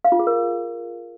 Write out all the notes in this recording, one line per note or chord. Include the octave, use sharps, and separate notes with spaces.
F5
F4
G#4
A#4